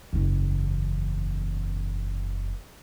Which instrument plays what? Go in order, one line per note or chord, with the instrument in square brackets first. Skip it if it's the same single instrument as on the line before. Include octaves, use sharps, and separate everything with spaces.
[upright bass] F#1 E2